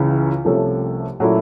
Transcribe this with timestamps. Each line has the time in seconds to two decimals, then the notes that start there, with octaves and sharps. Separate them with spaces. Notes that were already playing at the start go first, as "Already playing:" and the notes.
Already playing: C#2 C#3 E3
0.45 C2 C3 F3 A3 C#4
1.20 A#2 F#3 A3 C#4 E4